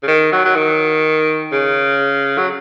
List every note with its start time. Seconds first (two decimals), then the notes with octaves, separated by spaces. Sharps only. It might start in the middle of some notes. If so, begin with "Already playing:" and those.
0.03 C#3
0.07 D#3
0.32 F#3
0.45 F#3
0.56 D#3
1.52 C#3
2.37 F#3